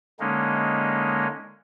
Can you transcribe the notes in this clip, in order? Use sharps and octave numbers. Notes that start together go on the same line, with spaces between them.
D3 G#3 A#3 C#4 D#4